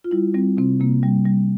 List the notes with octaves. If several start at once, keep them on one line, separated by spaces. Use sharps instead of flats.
F4
G3 E4
G3 C4
C3 C4
C3 A#3
G3
G3